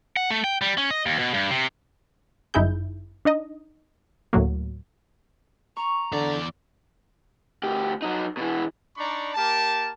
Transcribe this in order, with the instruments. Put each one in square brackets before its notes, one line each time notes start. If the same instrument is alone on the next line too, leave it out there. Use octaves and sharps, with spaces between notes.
[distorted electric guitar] F#5
A3
G5
G3
C#4
D#5
D#2
B2
G2
C3
[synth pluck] G1 F#2 D#4 E4 G#4 G6
D4 D#4 D#5
D2 A2 F#3 A#3
[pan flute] A#5 [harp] C#6
[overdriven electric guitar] E2 D5 [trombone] D3
[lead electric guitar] D2 G4
F#3 D#4
B2 E3
[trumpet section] D4 D#4 D5 A#5 B5 C#6
A#3 G4 A#4 A5